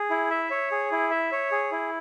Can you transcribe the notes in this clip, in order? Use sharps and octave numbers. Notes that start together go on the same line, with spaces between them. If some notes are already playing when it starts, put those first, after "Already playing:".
Already playing: G#4
E4
E5
C#5
G#4
E4
E5
C#5
G#4
E4